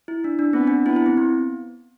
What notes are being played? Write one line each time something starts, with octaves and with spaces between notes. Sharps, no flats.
E4
D4
D4
B3 C4
D4
B3 E4
E4
C4
B3